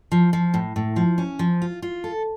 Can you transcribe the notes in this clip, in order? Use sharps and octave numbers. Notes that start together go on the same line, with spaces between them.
F3
F3
A2
A2
F3
C#4
F3
F4
F4
A4